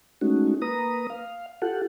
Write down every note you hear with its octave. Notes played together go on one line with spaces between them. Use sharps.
G#3 A3 C#4 D#4 F#4
A#3 B4 A#5 D#6
F5
F4 G4 A4 F#5